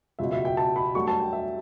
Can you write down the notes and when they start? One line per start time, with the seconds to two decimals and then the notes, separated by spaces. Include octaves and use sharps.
0.19 C#2 B2 F#3 E5
0.32 E5
0.45 G5
0.57 A5
0.76 B5
0.95 G2 F#3 A3 C#6
1.08 A5
1.20 G5
1.33 E5